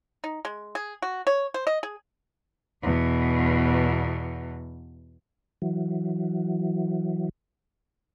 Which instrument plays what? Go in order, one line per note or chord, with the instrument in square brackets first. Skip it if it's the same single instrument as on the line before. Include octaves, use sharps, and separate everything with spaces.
[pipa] D#4
G#3
G#4
F#4
C#5
C5
D#5
G#4
[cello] E2 B2
[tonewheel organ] E3 F#3